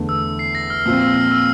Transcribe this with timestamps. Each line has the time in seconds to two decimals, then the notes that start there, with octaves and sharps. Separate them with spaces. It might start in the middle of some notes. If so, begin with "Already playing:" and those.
Already playing: E2 D3 A3
0.09 E6
0.39 C7
0.55 A#6
0.70 F6
0.86 A#2 F3 C4 E6
1.01 E6
1.16 F6
1.31 E6